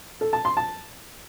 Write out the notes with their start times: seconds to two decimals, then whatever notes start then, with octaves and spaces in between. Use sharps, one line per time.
0.21 A4
0.33 A5
0.45 C6
0.57 A5